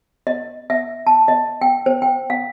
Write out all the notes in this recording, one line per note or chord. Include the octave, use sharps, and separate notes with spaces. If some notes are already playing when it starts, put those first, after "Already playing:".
D#5
E5
A5
D#5
G5
C5
G5
F5